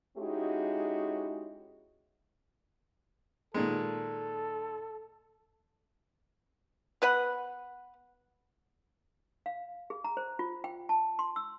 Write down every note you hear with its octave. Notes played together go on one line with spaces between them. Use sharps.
G#3 C#4 D#4 E4 F#4 G4
A#2 D#3 G#3 A4
B3 B4 F#5
F5
G#4
A#5
C5
F4
G5
A5
C6
E6